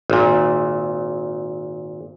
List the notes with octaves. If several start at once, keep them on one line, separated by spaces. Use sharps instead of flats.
G#1 A#2